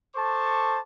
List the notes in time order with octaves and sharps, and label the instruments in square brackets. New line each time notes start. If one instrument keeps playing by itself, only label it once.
[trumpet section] A4 C5 A5 C#6 D6